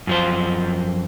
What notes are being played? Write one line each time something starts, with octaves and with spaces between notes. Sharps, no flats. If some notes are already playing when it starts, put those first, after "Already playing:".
F#2 F3 C5